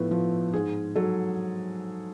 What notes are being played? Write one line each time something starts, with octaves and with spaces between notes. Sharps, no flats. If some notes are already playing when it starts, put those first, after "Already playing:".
Already playing: A2 F3 A3 B3
F3
G#2 G#4
F#3 A4